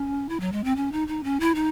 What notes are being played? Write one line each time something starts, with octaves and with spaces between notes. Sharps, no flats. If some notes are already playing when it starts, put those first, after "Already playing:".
Already playing: C#4
E4
F#3
G#3
C4
C#4
D#4
D#4
C#4
E4
D#4